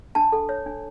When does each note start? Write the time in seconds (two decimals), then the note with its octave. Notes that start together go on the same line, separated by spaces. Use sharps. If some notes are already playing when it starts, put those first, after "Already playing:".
0.15 D4 A5
0.32 A4
0.49 C#5
0.66 D4